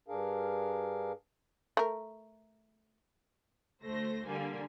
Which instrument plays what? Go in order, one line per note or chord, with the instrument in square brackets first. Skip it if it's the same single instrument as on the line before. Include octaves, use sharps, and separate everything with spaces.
[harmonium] G2 D4 G#4 A#4 F5
[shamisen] A3 A#4
[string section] D2 A3 C5 A#6
D3 G3 A#3 G#5